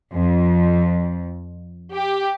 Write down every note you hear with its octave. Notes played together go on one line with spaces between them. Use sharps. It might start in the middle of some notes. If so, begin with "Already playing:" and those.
F2
G4